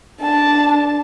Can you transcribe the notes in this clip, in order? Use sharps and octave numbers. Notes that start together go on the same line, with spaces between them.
D4 A5